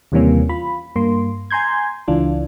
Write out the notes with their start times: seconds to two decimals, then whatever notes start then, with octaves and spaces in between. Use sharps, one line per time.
0.12 D#2 C3 E3 G3 A#3 C#4
0.49 F4 B5
0.96 G2 A#3 C6
1.50 G#5 A#5 C6 G6 G#6
2.08 C#2 E3 D4 F4